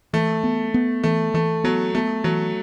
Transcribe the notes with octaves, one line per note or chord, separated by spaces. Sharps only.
E3 A3
B3
B3
E3 A3
E3 A3
F#3 B3
A3 B3
E3 F#3